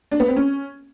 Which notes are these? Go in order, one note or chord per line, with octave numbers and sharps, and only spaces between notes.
D4
B3
C4
C#4